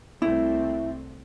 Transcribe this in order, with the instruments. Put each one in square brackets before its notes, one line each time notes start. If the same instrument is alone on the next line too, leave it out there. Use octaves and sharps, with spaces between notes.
[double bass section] C2 C3 A3 C4 [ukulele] E4